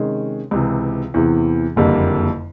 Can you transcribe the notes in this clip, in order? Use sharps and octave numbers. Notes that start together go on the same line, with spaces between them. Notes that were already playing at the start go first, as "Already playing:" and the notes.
Already playing: C3 D#3 G#3 C#4
C#2 C3 E3
E2 C3 E3
F#1 F2 D3 G3 A#3